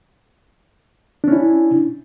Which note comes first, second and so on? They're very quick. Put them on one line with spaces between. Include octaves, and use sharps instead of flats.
D4 C#4 E4